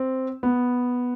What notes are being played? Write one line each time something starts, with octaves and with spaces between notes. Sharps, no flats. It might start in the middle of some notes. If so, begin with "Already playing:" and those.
Already playing: C4
B3